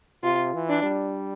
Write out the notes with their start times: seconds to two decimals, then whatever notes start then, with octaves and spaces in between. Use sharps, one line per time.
0.24 C3 F4
0.54 E3
0.69 D4
0.83 G3